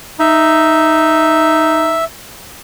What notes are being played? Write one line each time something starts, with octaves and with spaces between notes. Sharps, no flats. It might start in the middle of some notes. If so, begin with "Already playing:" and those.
D#4 E5